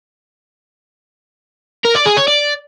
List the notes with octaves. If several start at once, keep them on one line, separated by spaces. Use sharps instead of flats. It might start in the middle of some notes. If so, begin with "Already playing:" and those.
A#4
D5
G#4
C#5
D5